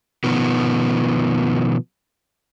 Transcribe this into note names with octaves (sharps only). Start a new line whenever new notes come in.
B2 D#3 F3 B3